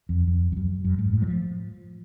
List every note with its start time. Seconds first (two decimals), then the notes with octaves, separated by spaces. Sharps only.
0.09 F2
0.28 F2
0.52 F2
0.56 F#2
0.84 F#2
0.99 G#2
1.13 A2
1.22 F#3
1.27 F3